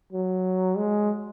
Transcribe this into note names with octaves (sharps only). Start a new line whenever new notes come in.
F#3
G#3